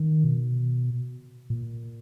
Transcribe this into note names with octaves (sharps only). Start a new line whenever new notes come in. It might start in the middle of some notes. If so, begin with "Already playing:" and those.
Already playing: D#3
B2
A#2